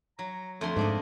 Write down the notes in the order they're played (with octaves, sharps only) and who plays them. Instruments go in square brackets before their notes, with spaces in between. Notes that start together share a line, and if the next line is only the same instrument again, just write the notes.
[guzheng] F#3 [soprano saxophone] A#5
[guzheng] F2 D3 C6 [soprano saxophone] A3
[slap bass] G#2 [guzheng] A#3 D4 D#5